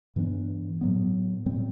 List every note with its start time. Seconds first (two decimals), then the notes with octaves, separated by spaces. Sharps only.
0.16 G2 E3 B3 D4
0.81 A2 F#3 B3
1.46 A2 G3 C4